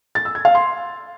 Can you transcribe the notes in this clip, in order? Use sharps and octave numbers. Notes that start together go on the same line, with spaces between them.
A6
E6
G#6
F5
C6